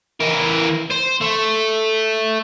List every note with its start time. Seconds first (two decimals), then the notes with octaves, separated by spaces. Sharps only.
0.20 E3 A#4
0.90 C5
1.21 A3